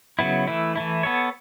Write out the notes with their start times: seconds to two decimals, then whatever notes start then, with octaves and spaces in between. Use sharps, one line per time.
0.19 C#3 F#3 B3 E4
0.48 E3 A3 E4
0.76 E3 A3 E4
1.03 B3 A4 C#5